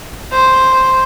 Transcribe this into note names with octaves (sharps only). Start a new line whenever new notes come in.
C5